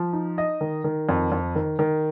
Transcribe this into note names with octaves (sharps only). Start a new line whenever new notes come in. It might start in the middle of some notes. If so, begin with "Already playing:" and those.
Already playing: F3
D#4
D#5
D#3
D#3
F2
F2
D#3
D#3